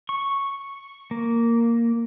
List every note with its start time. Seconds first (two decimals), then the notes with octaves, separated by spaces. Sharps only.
0.09 C#6
1.11 A#3